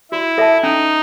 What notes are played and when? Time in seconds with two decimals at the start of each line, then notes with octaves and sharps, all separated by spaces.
0.11 E4 F#4
0.38 A4 E5 A5
0.63 C#4 D#4